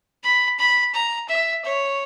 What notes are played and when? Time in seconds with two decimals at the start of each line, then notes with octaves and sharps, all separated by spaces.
0.24 B5
0.59 B5
0.94 A#5
1.29 E5
1.65 C#5